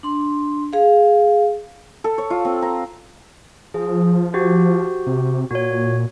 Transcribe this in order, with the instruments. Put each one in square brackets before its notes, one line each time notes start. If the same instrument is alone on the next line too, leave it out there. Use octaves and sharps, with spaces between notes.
[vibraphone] D4 C6
G#4 F5
[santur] A4
C#5
F4
C4
A#5
[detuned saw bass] F3 [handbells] G#4
[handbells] F#4 G4 C5
[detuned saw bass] C3
[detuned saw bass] A#2 [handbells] F#4 C#5